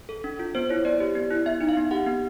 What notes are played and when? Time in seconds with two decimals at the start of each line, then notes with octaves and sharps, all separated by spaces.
0.09 A4
0.24 D4
0.39 F4
0.55 B3 C5
0.69 E4 C#5
0.85 B3 D5
1.00 G4
1.15 B3
1.30 E4
1.46 B3 E5
1.61 D#4
1.69 F5
1.77 B3
1.91 G4 F#5
2.06 B3